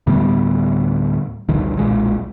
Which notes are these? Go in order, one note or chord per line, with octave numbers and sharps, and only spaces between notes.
D2 A2 G3 B3
A1 D2 G2 D#3
D#1 B1 A#2 G#3